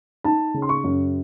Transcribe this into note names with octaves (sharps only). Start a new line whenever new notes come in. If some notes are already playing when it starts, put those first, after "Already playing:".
D#4 A5
C#3
C6
C#6
F#2